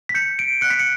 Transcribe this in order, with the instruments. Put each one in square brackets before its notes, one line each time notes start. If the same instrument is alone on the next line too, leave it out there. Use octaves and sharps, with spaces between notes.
[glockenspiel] B6
G6 C#7
D7
F#6 C#7
B6
C#7